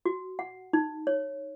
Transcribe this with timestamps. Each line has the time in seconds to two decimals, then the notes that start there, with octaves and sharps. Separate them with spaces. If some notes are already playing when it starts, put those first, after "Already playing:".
0.06 F#4
0.39 F#5
0.73 D#4
1.07 C#5